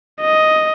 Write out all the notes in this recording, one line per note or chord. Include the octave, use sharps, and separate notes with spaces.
D#5